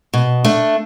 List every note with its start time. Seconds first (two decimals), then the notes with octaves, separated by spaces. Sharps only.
0.13 B2
0.45 A3 D4